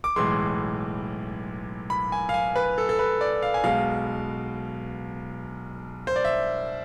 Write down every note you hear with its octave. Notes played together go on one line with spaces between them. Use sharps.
D6
B1 A2 E3 G#3 C6
B5
G#5
F5
G#5
B4
A4
A4
B4
D5
F5
G#5
B1 B2 G#3 F5
C5
D5
E5